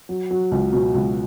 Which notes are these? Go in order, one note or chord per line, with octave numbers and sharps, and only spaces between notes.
F#3
F#3
C#2
B2
C#2